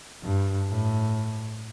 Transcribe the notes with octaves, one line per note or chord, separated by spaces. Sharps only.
G2
A2